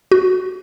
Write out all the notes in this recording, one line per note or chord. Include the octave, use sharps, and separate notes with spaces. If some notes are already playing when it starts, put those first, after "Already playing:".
F#4